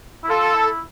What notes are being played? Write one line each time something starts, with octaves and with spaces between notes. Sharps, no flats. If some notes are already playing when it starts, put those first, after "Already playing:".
E4
F4 A4
E4